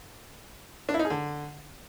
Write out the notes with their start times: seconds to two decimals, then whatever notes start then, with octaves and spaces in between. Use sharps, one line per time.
0.89 D4
0.94 E4
0.99 D#4
1.05 G#4
1.10 D3